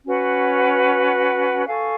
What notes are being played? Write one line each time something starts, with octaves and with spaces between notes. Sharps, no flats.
C#4 F#4 B4 F#5
A4 F5 G#5 C#6